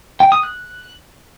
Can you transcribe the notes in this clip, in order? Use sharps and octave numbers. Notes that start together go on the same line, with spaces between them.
G5
D#6
F#6